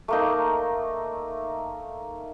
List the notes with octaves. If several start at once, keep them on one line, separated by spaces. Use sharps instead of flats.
A3 A#3 D#4